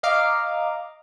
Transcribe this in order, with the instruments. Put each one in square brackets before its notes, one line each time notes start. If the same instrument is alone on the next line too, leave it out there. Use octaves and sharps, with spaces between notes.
[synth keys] D#5 F5 A#5 D6